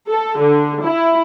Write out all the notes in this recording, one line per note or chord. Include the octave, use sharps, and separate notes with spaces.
A4
D3
E4